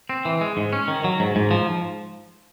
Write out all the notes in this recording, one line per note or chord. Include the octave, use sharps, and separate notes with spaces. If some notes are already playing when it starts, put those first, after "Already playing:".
C4
E3
G#3
G#2
C#4
D#3
F#3
G#2
G#2
F3